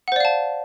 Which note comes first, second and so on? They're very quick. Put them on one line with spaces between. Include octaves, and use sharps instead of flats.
F#5 C5 D5 F5 A5